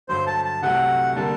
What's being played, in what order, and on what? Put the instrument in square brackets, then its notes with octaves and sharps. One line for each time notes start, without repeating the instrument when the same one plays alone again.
[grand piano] G2 D3 F#3 [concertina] C5
[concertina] A5
A5
[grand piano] C2 C3 F#3 A3 [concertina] F#5
[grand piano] D3 G3 A#3 [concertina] A5